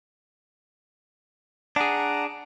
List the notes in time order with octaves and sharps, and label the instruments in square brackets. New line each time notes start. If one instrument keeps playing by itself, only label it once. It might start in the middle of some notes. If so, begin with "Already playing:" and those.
[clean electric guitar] D4 G#4 [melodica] F#5 A#5